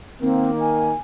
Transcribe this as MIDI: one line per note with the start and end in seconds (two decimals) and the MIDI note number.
0.22 0.93 51
0.22 0.93 58
0.22 0.52 60
0.60 0.95 80